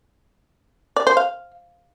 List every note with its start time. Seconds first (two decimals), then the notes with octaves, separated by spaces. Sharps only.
0.96 D5
1.07 C5
1.17 F5